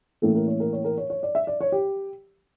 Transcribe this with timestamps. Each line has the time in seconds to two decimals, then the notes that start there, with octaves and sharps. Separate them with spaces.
0.22 A2 E3 A#3 C#4 A4
0.35 A#4
0.48 C#5
0.60 A#4
0.73 C#5
0.85 A#4
0.98 C#5
1.10 C#5
1.23 D5
1.35 E5
1.47 D5
1.61 C#5
1.72 G4